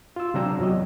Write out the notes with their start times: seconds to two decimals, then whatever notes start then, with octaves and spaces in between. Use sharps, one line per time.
0.16 F4 E6
0.34 C3 F#3 D4 G5 A#5 E6
0.59 E2 F#3 D#5